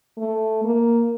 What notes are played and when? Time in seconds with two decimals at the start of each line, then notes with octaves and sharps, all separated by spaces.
0.17 A3
0.64 A#3